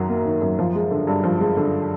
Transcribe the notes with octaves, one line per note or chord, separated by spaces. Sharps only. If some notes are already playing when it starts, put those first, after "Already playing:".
Already playing: F#2 D#3 F#3
A#3
D#3
F#2
F3
G#3
D3
G2
F3
G#3
D3